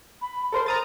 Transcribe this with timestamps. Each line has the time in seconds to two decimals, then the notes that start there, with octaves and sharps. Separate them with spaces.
0.21 B5
0.52 A4 A#4 C5 C6
0.66 A#4 A#5 D#6 A6